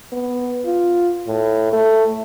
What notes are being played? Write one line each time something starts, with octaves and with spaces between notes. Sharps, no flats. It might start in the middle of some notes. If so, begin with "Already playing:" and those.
B3
F4
A2
A3